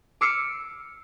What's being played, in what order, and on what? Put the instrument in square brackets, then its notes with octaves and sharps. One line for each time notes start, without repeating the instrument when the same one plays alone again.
[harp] D6 E6 F6 C7 C#7